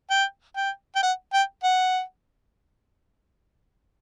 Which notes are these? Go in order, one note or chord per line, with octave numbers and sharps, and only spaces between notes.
G5
G5
G5
F#5
G5
F#5